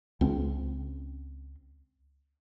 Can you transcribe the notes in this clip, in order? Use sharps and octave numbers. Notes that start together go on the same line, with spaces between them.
C#2 C4